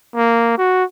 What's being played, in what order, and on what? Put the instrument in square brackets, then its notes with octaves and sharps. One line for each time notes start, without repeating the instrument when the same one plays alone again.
[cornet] A#3
F#4